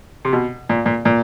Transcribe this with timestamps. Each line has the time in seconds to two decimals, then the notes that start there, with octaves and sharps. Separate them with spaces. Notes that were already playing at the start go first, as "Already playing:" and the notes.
0.25 C3
0.33 B2
0.69 A#2
0.86 A#2
1.05 A#2